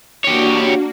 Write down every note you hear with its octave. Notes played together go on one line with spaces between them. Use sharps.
A#3 D4 F#4 G4 C#5